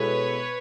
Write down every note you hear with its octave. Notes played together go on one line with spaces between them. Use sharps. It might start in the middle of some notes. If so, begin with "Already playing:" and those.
Already playing: B2 G#3 B3 E4 A4 B4 C#5